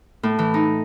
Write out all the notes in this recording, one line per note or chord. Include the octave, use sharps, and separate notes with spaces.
A2
E3
D#4